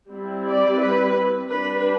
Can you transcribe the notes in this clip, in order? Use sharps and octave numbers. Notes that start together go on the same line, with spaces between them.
G3 C4 E4
D5
B4
G3 D4 B4